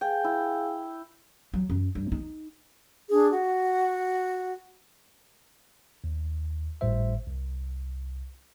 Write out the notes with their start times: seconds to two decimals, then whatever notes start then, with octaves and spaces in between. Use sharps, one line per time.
0.01 G#4 F5 G5 G#5
0.24 E4
1.54 F#3
1.70 F#2
1.95 G2
2.12 D#4
3.10 D4 G#4
3.30 F#4
6.04 D#2
6.81 G#1 A2 G3 C5 E5
7.27 C2